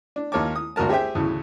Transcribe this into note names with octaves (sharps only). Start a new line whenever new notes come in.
D4
D#2 F4 A#4 C#5 A5 D6
D#6
G#1 D2 F#4 A#4 A5
G4 G#4 C5 E5 G5
D2 A2 C#3 E3